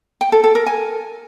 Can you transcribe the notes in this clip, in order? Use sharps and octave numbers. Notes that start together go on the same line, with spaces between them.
G5
A4
A4
A#4
G#5